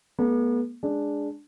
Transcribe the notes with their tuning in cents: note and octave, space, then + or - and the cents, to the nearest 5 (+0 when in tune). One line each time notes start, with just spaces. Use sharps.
G#3 +45 B3 -40
G#3 +0 D4 +0